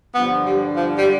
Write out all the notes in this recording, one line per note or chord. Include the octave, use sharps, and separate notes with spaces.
G2 D3 F3 B3
G3
F3
G3